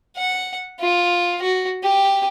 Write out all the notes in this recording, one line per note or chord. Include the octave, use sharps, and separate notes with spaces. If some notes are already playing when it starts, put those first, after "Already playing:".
F#5
F4
F#4
G4